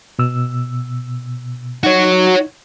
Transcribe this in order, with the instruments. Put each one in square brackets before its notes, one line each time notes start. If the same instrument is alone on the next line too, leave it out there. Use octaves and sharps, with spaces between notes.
[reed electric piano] B2 E6
[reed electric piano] D#4 [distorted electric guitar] F#4 C#5